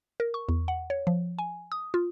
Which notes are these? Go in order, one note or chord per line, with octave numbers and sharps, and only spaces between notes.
A#4
C#6
E2
F#5
C#5
F3
G#5
D#6
F4